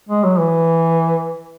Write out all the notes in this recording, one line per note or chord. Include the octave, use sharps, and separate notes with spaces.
G#3
F#3
E3